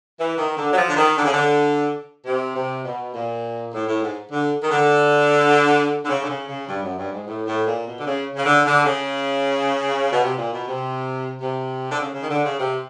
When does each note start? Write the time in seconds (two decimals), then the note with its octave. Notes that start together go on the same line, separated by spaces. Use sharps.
0.19 E3
0.38 D#3
0.57 D3
0.72 F#3
0.78 F3
0.90 D3
0.97 D#3
1.17 D3
1.25 C#3
1.33 D3
2.25 C3
2.55 C3
2.85 B2
3.14 A#2
3.73 A2
3.88 A2
4.03 G#2
4.32 D3
4.61 D#3
4.71 D3
6.04 D3
6.09 C#3
6.24 D3
6.29 C#3
6.49 C#3
6.68 G2
6.83 F#2
6.97 G2
7.12 G#2
7.27 A2
7.47 A2
7.67 A#2
7.87 B2
7.99 D3
8.06 C#3
8.36 C#3
8.45 D3
8.66 D3
8.85 C#3
10.12 B2
10.23 C3
10.38 A#2
10.53 B2
10.67 C3
11.41 C3
11.92 D3
12.00 C#3
12.15 C#3
12.23 D#3
12.30 D3
12.45 C#3
12.59 C3